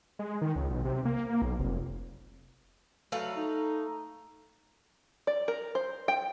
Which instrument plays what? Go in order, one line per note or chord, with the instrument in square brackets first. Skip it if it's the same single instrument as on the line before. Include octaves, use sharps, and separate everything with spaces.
[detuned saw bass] G#3
D#3
C#2
B1
C3
A#3
A#3
B1
F1
[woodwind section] F#3 G3 F#4 [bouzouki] A3 B4 F5
[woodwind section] D#4
[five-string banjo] D5
A#4
C5
G5